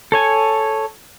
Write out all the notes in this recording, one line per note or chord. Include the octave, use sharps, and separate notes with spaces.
A4 C#5 G#5